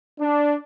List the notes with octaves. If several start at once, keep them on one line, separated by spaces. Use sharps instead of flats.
D4